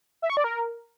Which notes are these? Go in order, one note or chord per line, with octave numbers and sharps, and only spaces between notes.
E5
C#6
D5
A#4